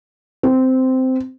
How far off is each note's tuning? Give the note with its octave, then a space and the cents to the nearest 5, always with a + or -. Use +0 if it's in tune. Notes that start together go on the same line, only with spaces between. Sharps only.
C4 -10